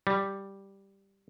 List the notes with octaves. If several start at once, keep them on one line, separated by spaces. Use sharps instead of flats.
G3